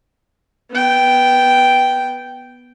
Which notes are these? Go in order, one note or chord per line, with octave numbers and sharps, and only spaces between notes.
B3 G5